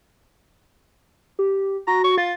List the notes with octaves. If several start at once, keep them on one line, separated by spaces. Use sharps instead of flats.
G4
F#4 A#5
C#6
F4 A6